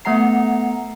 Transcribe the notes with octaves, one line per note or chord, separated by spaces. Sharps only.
A3 B3 F#5 A#5 C7